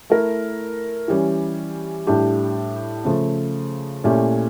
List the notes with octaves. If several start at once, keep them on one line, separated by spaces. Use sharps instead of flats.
A3 E4 A#4
E3 G3 C#4
A2 G3 D4 G4
C#3 F3 A3
A#2 A3 C#4 E4 G4